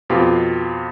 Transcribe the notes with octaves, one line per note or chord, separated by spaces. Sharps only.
F2 B2 F4 G4